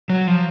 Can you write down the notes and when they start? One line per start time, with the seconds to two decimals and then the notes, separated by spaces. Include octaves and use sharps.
0.10 F#3
0.28 F3